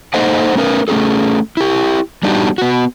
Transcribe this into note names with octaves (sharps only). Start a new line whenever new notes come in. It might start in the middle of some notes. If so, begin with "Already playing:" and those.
A#3 D#4 A4 C5 D#5 F#5
A3 C#4 A#4 B4
A3 C#4 D#4 G#4 A4
E4 G4
G3 B3 D4 D#4 F#4 G4
B3 F#4